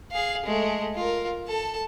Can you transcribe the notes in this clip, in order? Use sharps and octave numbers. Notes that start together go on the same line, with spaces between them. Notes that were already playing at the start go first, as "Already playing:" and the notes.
G#4 F5
G#3 A3
F4 A#4
A4 A5